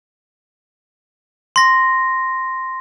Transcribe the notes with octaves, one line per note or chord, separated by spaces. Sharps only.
C6 A#6